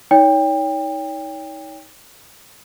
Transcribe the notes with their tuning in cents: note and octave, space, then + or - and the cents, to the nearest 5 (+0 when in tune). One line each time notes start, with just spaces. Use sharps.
D#4 +30 C#5 +30 G5 +25